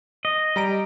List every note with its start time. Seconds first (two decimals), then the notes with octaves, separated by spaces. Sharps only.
0.25 D#5
0.56 G3 A#5 D7